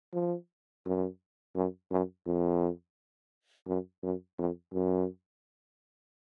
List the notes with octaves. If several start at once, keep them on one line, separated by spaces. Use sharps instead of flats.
F3
F#2
F#2
F#2
F2
F#2
F#2
F2
F#2